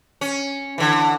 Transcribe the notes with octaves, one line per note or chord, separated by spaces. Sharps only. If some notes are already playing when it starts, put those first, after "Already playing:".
C#4
D3 E3